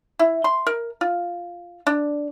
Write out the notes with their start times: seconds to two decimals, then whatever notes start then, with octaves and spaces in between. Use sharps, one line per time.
0.19 E4
0.44 C6
0.67 A#4
1.01 F4
1.87 D4